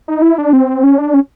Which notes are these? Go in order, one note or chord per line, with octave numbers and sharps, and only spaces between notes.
D#4
E4
D4
C4
C#4
D4
C#4